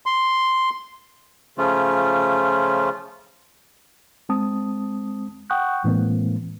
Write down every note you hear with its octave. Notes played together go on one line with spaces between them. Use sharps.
C6
C#3 F3 A3 C#4 F4
G#3 C4 A5 D#6
F#5 G5 C#6 D#6 F#6 G6
A2 E3 G#3 A#3 C4